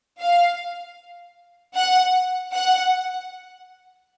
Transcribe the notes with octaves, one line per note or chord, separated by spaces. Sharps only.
F5
F#5
F#5